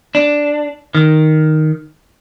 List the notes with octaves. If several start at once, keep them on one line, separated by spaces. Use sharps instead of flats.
D4
D#3